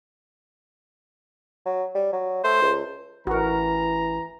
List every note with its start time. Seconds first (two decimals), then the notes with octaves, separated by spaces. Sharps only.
1.66 F#3
1.95 G3
2.12 F#3
2.44 A3 C5
2.62 C#2
3.27 A1 E3 F#4 A#4 A#5